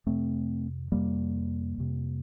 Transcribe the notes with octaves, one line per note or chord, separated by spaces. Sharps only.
F2 C3 A3 C4
F2 C3 G3 A#3
F2 C3